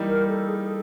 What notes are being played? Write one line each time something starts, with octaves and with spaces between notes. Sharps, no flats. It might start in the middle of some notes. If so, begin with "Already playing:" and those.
Already playing: E3 G3 A#3 D#4
A#4
A4
G#4
A4